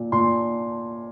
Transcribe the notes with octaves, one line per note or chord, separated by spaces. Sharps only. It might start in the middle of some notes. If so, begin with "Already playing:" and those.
Already playing: A#2
A#2 C6